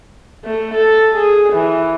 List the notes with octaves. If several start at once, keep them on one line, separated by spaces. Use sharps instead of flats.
A3
A4
G#4
E3